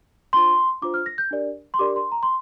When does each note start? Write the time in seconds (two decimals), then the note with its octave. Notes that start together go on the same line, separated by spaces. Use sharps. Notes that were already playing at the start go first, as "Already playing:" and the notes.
0.33 D4 F4 C5 C6
0.82 D4 F4 C5 D6
0.94 F6
1.06 A#6
1.18 G6
1.31 D4 G4 A#4 D5
1.74 C6
1.79 D4 G4 A#4 D5 D6
1.96 C6
2.12 A#5
2.23 C6